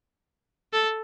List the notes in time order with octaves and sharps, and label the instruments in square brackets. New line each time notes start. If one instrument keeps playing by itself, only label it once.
[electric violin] A4